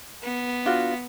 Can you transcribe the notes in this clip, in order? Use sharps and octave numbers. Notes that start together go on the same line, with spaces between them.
B3
D4 F4 F#4